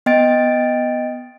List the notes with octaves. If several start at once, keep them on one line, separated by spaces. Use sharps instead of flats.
B3 D#5 G5 A6 D7